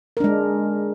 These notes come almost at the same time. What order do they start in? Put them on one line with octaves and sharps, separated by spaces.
A#4 D4 G#3